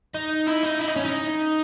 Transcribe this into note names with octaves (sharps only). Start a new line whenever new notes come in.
D#4
E4
D#4
E4
D#4
C#4
D#4